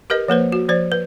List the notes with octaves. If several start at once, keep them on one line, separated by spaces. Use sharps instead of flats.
G4 A#4 B4 D#5
F3 A#3 B4 C5
F#4
F3 C5 D5
B4